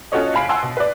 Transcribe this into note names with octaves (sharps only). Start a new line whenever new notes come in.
C#4 F4 F#4 A4 C#5 D#5
F#1 F5 G#5 B5 C7 D7
F#5 G#5 A5 C6 E6
B2
B4 D5